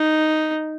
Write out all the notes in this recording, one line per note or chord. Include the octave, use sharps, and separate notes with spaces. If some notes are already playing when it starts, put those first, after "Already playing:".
Already playing: D#4